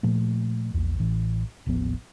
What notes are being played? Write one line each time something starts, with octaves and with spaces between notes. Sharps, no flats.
A#2 F3 A3
A#1 E2
A1 E3
D#1 A1 F3 B3